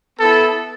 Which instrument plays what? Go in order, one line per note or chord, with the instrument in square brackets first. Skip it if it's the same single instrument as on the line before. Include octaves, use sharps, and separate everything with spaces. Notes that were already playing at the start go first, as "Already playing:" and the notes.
[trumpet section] B3 E4 A4